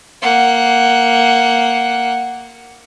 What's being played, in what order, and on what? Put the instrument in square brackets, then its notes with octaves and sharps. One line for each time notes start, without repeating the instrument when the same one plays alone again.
[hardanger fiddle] A#3 F#5